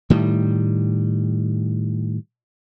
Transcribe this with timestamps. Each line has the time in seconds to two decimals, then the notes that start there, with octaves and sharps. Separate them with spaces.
0.10 A2 D#3 G3